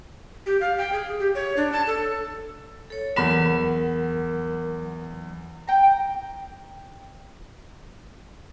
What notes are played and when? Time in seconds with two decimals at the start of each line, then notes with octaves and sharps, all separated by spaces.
0.46 G4
0.61 F5
0.78 G5
0.93 G#4
1.19 G4
1.35 C#5
1.57 D4
1.72 A5
1.87 A4
2.90 A4 C#5
3.16 E2 F#3 A#4 B5 E7
5.68 G5 A#5